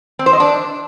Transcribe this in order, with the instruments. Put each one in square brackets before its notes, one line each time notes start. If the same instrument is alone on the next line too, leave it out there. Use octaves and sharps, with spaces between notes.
[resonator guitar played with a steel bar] C4
C5
D#5
D4